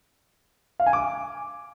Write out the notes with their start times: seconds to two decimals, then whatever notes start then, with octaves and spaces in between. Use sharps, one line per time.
0.80 F5
0.86 G#5
0.93 D6